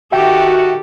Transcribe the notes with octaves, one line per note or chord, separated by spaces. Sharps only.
D#3 F#4 G4 A4 E5 G5